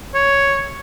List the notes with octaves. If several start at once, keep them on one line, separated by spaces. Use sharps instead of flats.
C#5